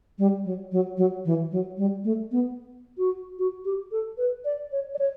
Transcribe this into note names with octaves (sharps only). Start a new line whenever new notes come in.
G3
F#3
F#3
F#3
E3
F#3
G3
A3
B3
F#4
F#4
G4
A4
B4
D5
C#5
D5
C#5